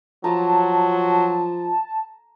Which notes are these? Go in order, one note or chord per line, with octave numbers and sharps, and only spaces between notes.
F3 F#3 A5 A#5